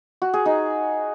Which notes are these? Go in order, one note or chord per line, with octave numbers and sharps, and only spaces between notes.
F#4
G#4
D#4